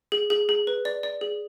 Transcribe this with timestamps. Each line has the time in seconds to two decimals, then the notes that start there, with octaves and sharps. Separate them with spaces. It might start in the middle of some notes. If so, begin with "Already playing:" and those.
0.12 G#4
0.30 G#4
0.49 G#4
0.67 B4
0.85 D5
1.03 D5
1.21 G#4